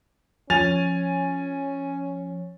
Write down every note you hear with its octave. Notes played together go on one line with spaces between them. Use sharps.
F3 C#4 G#5 A6 F7